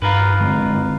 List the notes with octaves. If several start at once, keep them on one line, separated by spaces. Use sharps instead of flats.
G2 F4 A#4 B4
D3 G#3 C4